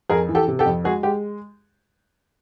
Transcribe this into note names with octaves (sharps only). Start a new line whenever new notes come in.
F2 G#4 A#4
E3
G4 A4
C3
G4 A4
F2
G#3 F#4 G#4
G#3 G4